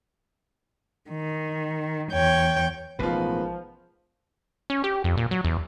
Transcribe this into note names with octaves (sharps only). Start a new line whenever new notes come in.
D#3
E2 C#5 G5
A1 B2 D#3 F3 G#3 B3 F4 B4
C#4
G4
F2
A#2
F#3
E2